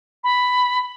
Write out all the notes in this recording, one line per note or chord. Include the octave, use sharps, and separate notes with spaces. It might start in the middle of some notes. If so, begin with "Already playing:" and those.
B5